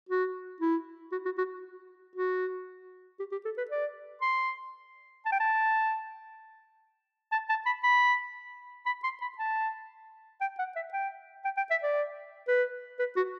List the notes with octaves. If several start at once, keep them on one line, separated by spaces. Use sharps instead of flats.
F#4
E4
F#4
F#4
F#4
F#4
G4
G4
A4
B4
D5
C6
A5
G5
A5
A5
A5
B5
B5
B5
C6
B5
A5
G5
F#5
E5
G5
G5
G5
E5
D5
B4
B4
F#4